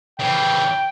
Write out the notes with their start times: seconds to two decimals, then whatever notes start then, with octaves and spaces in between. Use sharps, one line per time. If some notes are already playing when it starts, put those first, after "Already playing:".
0.19 C#3 E3 G5